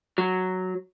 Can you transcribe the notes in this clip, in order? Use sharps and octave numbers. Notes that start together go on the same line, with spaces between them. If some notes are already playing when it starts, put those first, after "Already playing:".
F#3